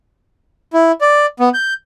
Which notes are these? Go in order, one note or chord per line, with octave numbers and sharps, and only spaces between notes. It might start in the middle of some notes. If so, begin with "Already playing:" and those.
E4
D5
B3
G6